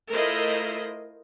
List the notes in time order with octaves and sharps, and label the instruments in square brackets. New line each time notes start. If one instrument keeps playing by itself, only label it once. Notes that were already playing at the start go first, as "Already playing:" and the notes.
[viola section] A3 E4 F4 A#4 C5 D#5